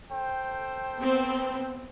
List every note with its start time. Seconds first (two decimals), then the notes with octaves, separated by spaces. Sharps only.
0.11 A4 C5 G5
0.98 B3 C4